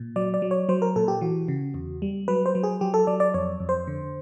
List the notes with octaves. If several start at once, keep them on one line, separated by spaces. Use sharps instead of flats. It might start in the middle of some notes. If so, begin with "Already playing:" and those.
Already playing: A#2
F#3 D5
D5
F#3
C#5
F#3 C5
A#4
A#2 A4
G4
E3 F#4
C#3
E2
G3
F#3 B4
C5
F#3
G#4
F#3 G4
A4
F#3 D5
D5
F2 C#5
F2
C5
D3